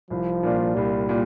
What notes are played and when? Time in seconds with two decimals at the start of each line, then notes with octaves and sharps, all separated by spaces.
0.10 C2 F3
0.43 A#2 A#3 D4 F4
0.75 C2 G3
1.09 A#2